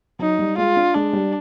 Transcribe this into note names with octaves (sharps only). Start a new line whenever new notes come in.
F#3 D#4
G3
G#3 F4
D4
G#3 D4
G3